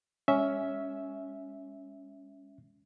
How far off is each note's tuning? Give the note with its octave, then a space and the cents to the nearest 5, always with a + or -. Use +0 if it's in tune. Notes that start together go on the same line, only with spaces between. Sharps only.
G#3 -35 C#4 +10 E5 -10